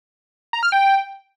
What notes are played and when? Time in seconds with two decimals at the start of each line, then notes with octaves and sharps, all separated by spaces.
0.53 A#5
0.63 F6
0.72 G5